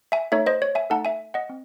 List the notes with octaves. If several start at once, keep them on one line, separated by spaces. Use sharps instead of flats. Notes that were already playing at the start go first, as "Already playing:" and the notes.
E5 G#5
A3 D#4 A4 C#5 E5
C5 D#5
C#5
E5 G#5
A3 D#4 A4 F#5 A5
E5 G#5
D#5 F#5
C4